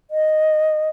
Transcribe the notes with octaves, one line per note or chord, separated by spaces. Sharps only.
D#5